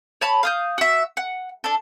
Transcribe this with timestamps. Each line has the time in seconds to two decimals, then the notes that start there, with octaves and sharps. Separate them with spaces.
0.21 C#5 A5 B5
0.43 F5 D#6 G6
0.78 F#4 E5
1.17 F#5
1.64 D4 A4